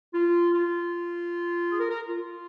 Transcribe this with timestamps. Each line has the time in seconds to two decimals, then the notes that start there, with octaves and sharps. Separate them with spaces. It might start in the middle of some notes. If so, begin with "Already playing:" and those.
0.14 F4
0.53 F4
1.70 G#4
1.80 A#4
1.90 A#4
2.09 F4